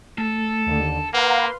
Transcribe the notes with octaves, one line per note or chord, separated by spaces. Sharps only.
A3 A4
D#2 D3
A#3 B4 F5 F#5 A#5 C6